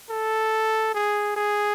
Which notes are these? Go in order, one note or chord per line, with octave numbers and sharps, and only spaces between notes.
A4
G#4
G#4